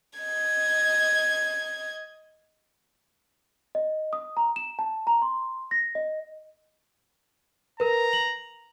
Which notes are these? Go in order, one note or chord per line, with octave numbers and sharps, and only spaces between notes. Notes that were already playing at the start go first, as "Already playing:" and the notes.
D#5 G#6
D#5
D#6
A#5
E7
A5
A#5
C6
A#6
D#5
A#4 B4 A#5
F#7